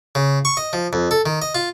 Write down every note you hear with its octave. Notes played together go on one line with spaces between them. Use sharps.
C#3
C#6
D#5
F3
F2
A4
D#3
D#5
F4